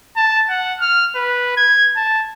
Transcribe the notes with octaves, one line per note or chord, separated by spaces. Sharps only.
A5
F#5
F6
B4
G#6
A5